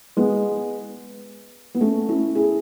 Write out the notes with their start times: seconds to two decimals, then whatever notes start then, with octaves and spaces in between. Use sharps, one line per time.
0.17 G#3 B3
1.75 B3
1.81 A3 C#4
2.09 C#4 E4
2.35 E4 G#4